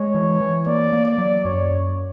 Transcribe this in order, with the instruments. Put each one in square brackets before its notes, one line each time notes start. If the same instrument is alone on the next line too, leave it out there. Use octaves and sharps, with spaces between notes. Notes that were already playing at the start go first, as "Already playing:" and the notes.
Already playing: [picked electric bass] G#3 [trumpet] C#5
[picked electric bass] E3
E3
[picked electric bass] A#3 [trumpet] D5
[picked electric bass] A#3
[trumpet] D5
[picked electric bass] F#3
[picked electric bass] F#2 [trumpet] C#5
[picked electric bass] F#2